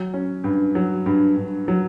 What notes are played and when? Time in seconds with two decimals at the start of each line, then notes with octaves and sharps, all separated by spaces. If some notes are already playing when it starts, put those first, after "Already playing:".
Already playing: F#3
0.14 C#4
0.44 G2
0.75 F#3
1.06 G2
1.36 G2
1.68 F#3